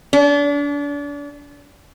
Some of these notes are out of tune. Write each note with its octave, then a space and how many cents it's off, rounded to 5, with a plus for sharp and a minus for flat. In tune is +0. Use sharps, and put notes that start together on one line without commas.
D4 -35